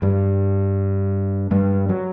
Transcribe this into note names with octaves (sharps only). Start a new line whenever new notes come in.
G2 G3
G2 G3
F#3